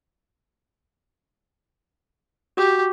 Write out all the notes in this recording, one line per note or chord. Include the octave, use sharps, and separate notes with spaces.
F#4 G4